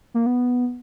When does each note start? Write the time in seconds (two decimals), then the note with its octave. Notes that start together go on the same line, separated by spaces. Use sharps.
0.14 A#3
0.26 B3